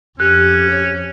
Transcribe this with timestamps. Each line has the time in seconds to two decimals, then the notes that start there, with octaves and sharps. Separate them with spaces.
0.20 F2 C#4 G4 F#6
0.70 C#5